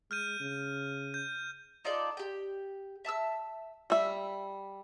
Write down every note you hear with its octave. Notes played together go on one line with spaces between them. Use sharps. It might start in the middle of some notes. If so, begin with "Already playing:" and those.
G#3 F6 G6 D#7
C#3
G6
D#4 F4 A4 D5
G4 G5
E5 A5 D#6 E6
G3 E5